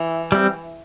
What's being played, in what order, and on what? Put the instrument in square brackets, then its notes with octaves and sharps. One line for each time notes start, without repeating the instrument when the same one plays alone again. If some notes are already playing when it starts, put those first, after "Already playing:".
Already playing: [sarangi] E3
[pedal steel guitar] G3 C4